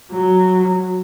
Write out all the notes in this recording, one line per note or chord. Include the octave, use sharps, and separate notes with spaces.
F#3